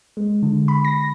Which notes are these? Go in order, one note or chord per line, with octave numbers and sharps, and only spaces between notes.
G#3
D3
B5
A#6